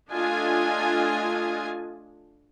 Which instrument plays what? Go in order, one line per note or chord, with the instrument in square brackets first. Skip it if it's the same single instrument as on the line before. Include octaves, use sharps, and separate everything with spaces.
[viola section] A3 D4 F4 D#5 G#5